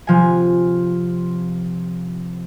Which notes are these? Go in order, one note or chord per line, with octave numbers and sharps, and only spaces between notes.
C3 F3 G#5